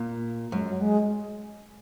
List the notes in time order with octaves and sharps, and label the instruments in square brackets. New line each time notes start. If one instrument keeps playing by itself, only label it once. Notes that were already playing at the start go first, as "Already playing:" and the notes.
Already playing: [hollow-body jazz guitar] A#2
[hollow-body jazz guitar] F#2 [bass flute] G#3
[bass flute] F#3
G#3